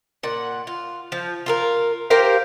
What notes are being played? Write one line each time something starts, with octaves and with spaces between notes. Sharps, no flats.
A#2 F#5
F4
F3
F4 A4 A#4
G4 A#4 C5 F5